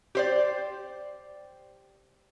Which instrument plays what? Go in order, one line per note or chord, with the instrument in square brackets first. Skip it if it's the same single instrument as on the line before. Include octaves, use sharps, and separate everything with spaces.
[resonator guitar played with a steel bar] G4 C5 D5